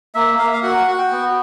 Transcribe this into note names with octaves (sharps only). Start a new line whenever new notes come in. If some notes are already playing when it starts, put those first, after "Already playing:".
A#3 E5
A#3 F5
E5
F5
F#4 F#5
F#4 F#5
G5
B3